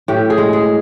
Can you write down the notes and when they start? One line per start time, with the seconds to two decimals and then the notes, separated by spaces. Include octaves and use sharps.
0.08 A2 G4
0.30 G#4
0.38 G#3
0.53 G#4